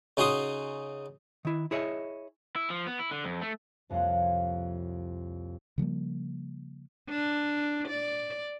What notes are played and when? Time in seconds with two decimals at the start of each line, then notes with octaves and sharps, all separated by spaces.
0.17 C#3 D#4 F#4 C6 D#6
1.45 D#3 E4
1.71 E4 G#4 C#5 D#5 E5
2.56 E4
2.70 F3
2.87 B3
2.99 E4
3.11 D3
3.25 F2
3.42 A3
3.90 C2 F2 A#3 C#5 F#5 C6
5.78 C#3 F3 G3 A#3
7.09 D4
7.88 D5